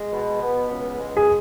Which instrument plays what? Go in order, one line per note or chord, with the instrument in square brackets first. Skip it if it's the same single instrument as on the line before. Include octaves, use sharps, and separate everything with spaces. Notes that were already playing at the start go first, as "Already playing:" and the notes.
Already playing: [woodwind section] G#3
B2
B3
C#2
G#3
[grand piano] G#4